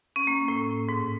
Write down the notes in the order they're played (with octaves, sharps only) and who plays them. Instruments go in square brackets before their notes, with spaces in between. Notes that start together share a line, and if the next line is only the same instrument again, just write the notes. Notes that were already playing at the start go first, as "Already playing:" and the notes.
[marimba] C#4
A#3
A2
G#2